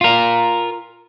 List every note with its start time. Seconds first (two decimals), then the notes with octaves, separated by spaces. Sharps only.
0.01 F4 A#4